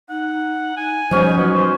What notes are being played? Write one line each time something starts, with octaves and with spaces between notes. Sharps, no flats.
D#4 F#5
D#4 G#5
B2 F3 G3 C#4 D#4 C5
F#3 B3 B4
F#4 C5